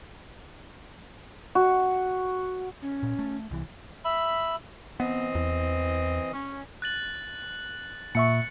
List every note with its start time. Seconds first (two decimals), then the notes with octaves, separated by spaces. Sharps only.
1.55 F#4
2.82 C#4
3.03 A#2
3.19 A3
3.51 C2 E3
4.05 E5 B5
5.00 E3 B3 C4 D#5
5.35 E2
6.32 C#4
6.82 F#6 A6 F#7
8.15 A#2 E5 C#6 C#7